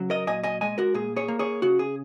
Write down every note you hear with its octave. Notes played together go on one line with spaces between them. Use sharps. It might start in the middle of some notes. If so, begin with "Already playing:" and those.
Already playing: C#3 F#3
A#4 D#5
A#2 D#5 G#5
D#5 G#5
G#3 D#5 G#5
F#4 A#4
A#2 G#4
G#4 C#5
A#3
G#4 C#5
C#3 F#4
G#4